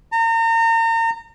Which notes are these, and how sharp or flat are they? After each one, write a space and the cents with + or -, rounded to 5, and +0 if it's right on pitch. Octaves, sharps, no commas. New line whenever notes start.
A#5 -35